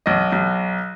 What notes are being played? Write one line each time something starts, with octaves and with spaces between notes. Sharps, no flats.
B1 D#5
B1